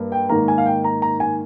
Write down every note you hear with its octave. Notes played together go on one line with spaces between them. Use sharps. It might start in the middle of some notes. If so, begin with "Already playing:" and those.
Already playing: G2 A#3
G5
G#2 D#3 A#3 A#5
G#5
F5
G5
A#5
A#5
G#5